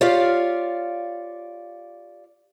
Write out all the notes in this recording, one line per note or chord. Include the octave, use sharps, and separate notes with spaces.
F4 G4 C#5 D5 F5